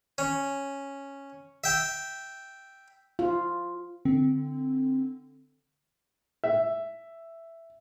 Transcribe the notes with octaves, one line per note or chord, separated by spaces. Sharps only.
C#4
E5 G5
F4
D3 C4
E5